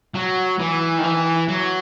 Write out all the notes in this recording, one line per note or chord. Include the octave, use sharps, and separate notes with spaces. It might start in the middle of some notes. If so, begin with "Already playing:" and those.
F#3
E3
D#3
E3
F#3